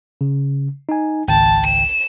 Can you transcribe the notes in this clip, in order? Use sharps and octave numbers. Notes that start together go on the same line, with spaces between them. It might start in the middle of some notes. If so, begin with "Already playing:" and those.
C#3
D#4 G#5
G#1 C#2 G5 A5
E7